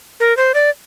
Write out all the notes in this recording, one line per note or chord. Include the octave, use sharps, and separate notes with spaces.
A#4
C5
D5